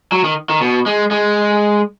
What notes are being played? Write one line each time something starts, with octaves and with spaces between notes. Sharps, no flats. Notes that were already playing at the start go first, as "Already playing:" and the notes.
F#3
D#3
D#3
B2
G#3
G#3